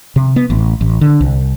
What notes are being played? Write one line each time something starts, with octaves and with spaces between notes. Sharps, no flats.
C3
B3
A1
A1
D3
C2